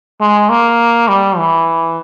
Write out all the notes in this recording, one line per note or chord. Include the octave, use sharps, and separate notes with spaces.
G#3
A#3
G3
E3